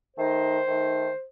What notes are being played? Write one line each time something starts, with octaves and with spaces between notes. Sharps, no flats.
D#3 A3 D#4 C5
D#3 A3 D#4